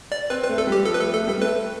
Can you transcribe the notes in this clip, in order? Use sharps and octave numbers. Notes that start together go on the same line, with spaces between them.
D5
C4 B4
B4
A3
A4
G3 G4
F3 A4
B4
A3 A4
A3 A4
G3 A4
A3 B4